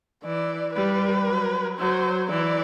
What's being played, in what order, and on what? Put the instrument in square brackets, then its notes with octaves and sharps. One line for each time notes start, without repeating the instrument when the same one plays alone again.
[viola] E3 [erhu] D5
[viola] G3 [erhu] B4
[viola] F#3
[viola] F#3 [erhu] C5
[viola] E3 [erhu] D5